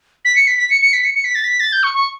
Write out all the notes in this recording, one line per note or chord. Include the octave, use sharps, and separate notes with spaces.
B6
C#7
B6
B6
C#7
C#7
B6
C#7
C#7
B6
A6
B6
A6
G6
C#6
C#6